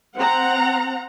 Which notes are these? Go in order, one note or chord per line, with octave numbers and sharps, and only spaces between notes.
C4 F#5 A#5